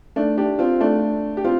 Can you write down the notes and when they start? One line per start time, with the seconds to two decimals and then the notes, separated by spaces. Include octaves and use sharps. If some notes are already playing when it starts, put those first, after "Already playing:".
0.16 A3 D4
0.37 D4 G4
0.59 C4 F4
0.80 A3 D4
1.37 G4
1.44 C4 F4